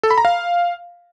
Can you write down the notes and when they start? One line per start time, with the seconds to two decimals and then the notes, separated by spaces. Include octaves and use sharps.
0.03 A4
0.11 B5
0.18 A#5
0.25 F5